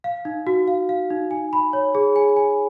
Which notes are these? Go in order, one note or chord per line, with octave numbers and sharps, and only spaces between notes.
F5
D#4
F#4
F5
F5
D#4
G#5
B5
C#5
G#4
G#5
G#5